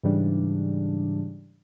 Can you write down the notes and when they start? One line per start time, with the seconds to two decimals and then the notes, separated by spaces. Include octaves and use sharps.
0.03 G#2 C#3 E3 G3 D4